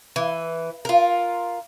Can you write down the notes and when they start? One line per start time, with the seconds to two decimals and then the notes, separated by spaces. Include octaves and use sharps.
0.16 E3
0.85 F4 A#4